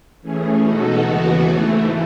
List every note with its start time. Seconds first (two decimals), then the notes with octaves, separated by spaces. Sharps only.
0.22 E3 A3 C#4 G#4
0.61 B2 G#3 D#4 F#4 A4
1.00 D#2 C#3 E3 B3 F#4
1.38 G#2 E3 A3